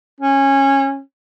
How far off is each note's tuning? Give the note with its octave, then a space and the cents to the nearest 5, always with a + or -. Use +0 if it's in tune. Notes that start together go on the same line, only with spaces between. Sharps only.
C#4 -20